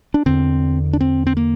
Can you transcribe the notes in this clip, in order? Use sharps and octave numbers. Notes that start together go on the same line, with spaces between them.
D4
E2 D3 C4
D4
C4
C4
A#3